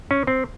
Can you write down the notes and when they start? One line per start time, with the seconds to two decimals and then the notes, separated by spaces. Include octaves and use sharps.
0.11 C#4
0.27 C4